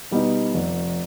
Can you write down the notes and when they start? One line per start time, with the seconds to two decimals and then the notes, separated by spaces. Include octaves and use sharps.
0.11 B2 G3 B3 D#4
0.54 F1